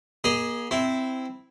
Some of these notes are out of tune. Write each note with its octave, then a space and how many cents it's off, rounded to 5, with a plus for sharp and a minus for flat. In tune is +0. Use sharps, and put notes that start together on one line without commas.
A#3 +35 G#4 +0 D#5 +0
C4 -10 E4 +0